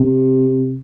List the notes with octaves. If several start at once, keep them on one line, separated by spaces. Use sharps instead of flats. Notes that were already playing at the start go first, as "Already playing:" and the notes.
Already playing: C3